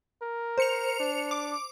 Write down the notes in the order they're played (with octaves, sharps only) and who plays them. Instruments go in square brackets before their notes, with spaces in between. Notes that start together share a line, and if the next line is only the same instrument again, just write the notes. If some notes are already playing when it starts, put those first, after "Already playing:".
[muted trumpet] A#4
[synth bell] C5 C#7 F7
[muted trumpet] D4
[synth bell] D6